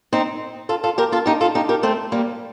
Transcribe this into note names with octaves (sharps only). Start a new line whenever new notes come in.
C4 D#4
F4 A4
F4 A4
G4 A#4
F4 A4
D#4 G4
F4 A4
D#4 G4
G4 A#4
A3 C4
G3 A#3